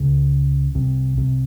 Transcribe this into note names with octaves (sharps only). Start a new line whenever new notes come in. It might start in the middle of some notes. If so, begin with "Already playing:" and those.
Already playing: C#2 C#3
C2 C3
C2 C3